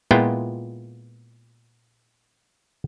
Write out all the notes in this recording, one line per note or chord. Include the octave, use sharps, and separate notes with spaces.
A#2 G#3 B3 E4 F4 G5